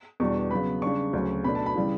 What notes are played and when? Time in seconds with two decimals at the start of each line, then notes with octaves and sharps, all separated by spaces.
0.20 E2 B2 G3 D4 C#6
0.51 C#3 F#3 B3 B5
0.82 C#3 G3 D4 C#6
1.13 D2 C#3 F#3 C#4
1.44 B2 A3 D4 B5
1.55 A5
1.66 B5
1.76 C#3 E3 G3